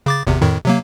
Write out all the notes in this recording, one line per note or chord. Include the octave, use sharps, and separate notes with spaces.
C#3 D6 A6
G#1 E2 C3
F2 A2 D#3
C3 F#3 A#3